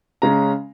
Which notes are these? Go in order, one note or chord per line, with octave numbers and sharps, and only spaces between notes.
C#3 G#3 C#4 A#5